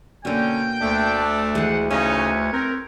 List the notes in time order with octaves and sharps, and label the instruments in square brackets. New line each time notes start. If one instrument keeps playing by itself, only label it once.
[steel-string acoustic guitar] B2 A#3 [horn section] D3 C#4 [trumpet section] G5
[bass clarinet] D2 [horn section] A3 D4
[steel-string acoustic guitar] E3 G#3 [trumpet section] C5 F#5
[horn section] C#3 C#4 D#4 [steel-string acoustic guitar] A3 [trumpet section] B4 C#5
[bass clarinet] C4 [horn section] A#4